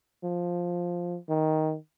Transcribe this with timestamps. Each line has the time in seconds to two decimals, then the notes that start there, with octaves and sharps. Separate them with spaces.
0.24 F3
1.29 D#3